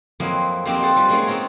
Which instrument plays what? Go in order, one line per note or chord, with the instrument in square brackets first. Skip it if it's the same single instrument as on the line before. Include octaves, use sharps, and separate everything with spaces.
[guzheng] F2 F#3 A#3 C4 E4 D#5
F2 A#3 C4 D#4 F#4 G4
A4 C5 F#5 A5
G3 F4 B4
F#3 G#3 A#3 C#4 D#4 F#4
B3 C4 F4 A#4 C#5